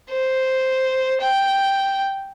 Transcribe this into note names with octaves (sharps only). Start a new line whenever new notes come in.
C5
G5